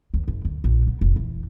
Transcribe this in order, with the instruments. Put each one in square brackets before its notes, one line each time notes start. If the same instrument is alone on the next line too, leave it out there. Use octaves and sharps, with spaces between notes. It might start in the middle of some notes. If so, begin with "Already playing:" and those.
[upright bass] D#2
F#1
D2
A#1
B3
F1
E3